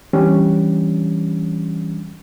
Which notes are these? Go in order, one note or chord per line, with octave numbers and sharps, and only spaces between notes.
E3 G3 C#4 D4